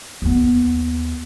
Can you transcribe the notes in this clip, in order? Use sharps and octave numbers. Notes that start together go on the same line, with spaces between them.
D#2 B3